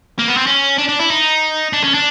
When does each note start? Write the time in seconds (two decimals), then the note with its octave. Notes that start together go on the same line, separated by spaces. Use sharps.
0.19 A#3
0.28 B3
0.37 C4
0.47 C#4
0.78 D4
0.89 D4
1.00 E4
1.10 D#4
1.73 D4
1.84 C#4
1.94 D4